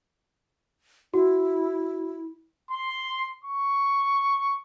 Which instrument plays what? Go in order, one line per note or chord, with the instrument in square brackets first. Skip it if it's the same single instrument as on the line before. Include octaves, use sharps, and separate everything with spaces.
[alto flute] E4 [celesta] F#4
[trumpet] C6
C#6